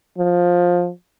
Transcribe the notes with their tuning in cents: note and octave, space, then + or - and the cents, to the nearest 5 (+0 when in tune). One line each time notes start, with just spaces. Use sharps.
F3 +15